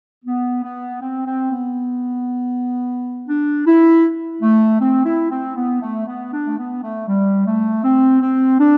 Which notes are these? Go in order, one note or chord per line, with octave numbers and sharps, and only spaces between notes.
B3
B3
C4
C4
B3
D4
E4
A3
C4
E4
C4
B3
A3
B3
D4
A3
B3
A3
G3
A3
C4
C4
D4